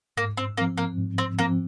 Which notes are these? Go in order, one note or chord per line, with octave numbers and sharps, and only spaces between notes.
G#2 A#3
C4
F3 A#3 C4
A#3
G#2
C4
F3 A#3 C4